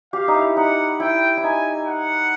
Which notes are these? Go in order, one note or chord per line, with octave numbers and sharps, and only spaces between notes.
G4 F5
D#4
E4
D#4 F#5
E4 G5
E4
D#4 G#5
F#5